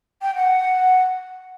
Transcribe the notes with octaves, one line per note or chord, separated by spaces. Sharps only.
G5
F#5